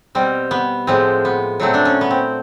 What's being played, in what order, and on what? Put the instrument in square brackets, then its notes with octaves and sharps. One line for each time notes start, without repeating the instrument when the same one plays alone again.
[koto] B2 G3 C4
B3
A2 F3 G#3 C4
B3
A#2 F#3 A3 C4
D4
C#4
B3
C4